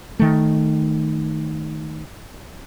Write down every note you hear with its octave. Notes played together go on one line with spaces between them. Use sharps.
D#3 A3